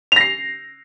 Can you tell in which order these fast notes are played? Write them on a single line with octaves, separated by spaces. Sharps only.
F7 A#6 C7